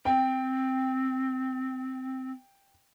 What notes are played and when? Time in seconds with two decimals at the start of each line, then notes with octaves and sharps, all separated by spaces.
0.05 C4 G5